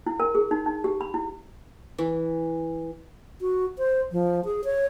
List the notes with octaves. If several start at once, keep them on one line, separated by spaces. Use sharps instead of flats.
E4
A#4
G#4
D#4
D#4
G4
B5
E4
E3
F#4
C5
F3
G#4
C#5